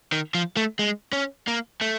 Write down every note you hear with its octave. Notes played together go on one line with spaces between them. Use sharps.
D#3
F3
A3
G#3
C#4
A#3
A3